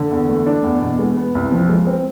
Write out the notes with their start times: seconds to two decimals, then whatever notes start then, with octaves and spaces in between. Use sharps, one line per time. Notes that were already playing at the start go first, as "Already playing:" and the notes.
Already playing: D3
0.11 E2
0.28 A3
0.46 D4
0.64 E2
0.81 B2
0.99 G#3
1.17 B3
1.35 C2
1.52 F3
1.69 G#3
1.87 C4